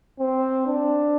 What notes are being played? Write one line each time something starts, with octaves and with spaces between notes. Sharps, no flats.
C4
D4